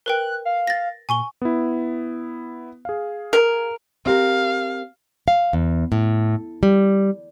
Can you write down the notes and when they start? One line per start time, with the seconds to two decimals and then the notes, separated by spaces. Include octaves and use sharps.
0.06 A#4 B4 G5 F#6
0.45 F5
0.67 A6 A#6
1.09 A#2 G#5 C#6 G7
1.42 B3 E4
2.85 G#4 F5
3.33 A#4
4.06 C4 G4 A#4 F5
5.28 F5
5.53 E2
5.92 A2
6.63 G3